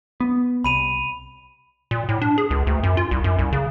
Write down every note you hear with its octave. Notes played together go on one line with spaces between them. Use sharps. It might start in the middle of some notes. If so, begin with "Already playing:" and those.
B3
C2 B5 D#7 F7
A#2
A2
D4
G#4
C#2
D2
F#2
F4
C2
F#2
C2
C#3